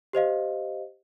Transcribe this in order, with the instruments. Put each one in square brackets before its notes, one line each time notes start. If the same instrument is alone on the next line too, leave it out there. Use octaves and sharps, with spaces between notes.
[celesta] G4 C5 D#5 F5